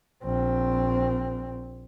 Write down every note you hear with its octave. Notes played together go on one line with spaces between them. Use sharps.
A#1 C4